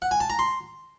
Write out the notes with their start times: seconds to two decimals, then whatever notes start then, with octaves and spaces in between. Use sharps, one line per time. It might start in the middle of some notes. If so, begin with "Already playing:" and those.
0.02 F#5
0.11 G#5
0.20 A5
0.30 A#5
0.39 C6